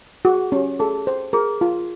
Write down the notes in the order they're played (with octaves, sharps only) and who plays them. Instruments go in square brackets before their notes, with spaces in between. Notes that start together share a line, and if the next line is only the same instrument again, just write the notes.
[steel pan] F#4 [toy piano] G#4
[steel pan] C#4 [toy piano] G4
[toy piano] G#4 [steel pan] A4
[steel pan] C5
[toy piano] G#4 [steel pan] A#4
[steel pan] F4